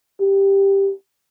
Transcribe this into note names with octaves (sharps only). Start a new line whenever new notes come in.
G4